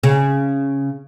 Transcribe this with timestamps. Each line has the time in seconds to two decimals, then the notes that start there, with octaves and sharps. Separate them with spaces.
0.03 C#3